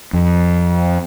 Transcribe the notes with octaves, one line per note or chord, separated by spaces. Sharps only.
F2